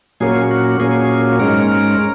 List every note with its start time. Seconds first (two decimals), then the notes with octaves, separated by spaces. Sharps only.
0.20 A#2 F#3 A#3 C#4 G#4
0.51 F#4
0.80 A#2 F#3 A#3 C#4 G#4
1.39 G#2 G#3 C#4 A#4